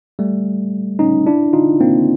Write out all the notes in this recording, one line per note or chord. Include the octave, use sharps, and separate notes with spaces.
G3 A3
C#4 D#4
D4 E4
D#4 F4
A#3 C4